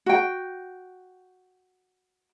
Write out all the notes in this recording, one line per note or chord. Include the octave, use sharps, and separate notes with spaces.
F#4 G5